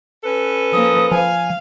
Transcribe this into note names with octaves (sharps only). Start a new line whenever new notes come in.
C#4 A4 B4
F3 A#3 D#6
F3 F5 G#5